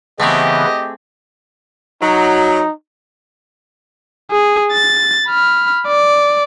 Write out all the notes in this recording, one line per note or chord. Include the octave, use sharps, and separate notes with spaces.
C#3 E3 A3 B3 C4 G4 G#4 D#5
F#3 D#4
G#4
A6
B5 F6
D5